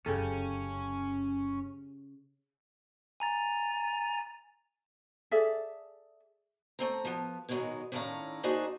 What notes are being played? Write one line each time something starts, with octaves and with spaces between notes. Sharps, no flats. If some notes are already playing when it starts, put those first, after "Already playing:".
F1 F#2 C#3 C#4 G4 A4
G#5 A#5 A6
G#4 A4 D5 E5
A3 C4 A#5
F3 B3
G#2 B2 D#3 E3 F#3 G#3
A2 D#3 C#4 D4 F5 A#5
A#3 D4 D#4 F#4 G#4 C5